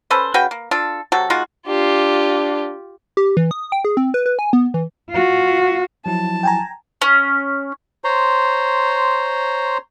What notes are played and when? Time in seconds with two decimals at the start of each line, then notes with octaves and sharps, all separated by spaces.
0.10 C#4 A4 B4 C5
0.34 C#3 F#4 B4 G5
0.51 A#3
0.71 D4 F4 A4
1.12 C3 F#3 F#4 A4
1.30 G#3 D#4 F4 F#4
1.68 D4 F4 G4
3.17 G4
3.37 E3
3.51 D#6
3.72 G5
3.85 G#4
3.97 C4
4.14 B4
4.26 B4
4.39 G#5
4.53 B3
4.74 E3
5.10 F4 F#4
6.06 F3 F#3 E4 A5
6.43 G5 G#5 A#5
7.02 C#4
8.04 C5 C#5 A#5 C6